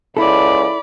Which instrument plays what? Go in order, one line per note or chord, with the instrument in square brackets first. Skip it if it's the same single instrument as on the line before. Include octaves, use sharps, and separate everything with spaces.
[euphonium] C#2 [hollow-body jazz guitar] E4 A4 [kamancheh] D5 B5